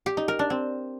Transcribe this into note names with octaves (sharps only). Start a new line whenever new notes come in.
G4
D#4
A#4
D4
C4